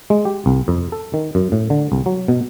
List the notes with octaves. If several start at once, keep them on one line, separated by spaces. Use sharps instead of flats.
G#3
G4
C2
F2
A4
D#3
F#2
A2
D3
C2
F#3
B2